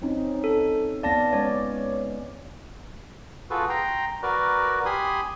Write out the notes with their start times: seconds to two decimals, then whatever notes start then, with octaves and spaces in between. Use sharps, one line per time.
0.02 C4 C#4 D#4
0.44 A4
1.03 B3 D5 F5 A5 A#6
1.33 G#3 C#4 C#5 D5
3.50 F4 F#4 G#4 A4 B4
3.69 G5 A#5 C6
4.23 F#4 A#4 B4 D5
4.86 G4 G#5 B5 C6 D#6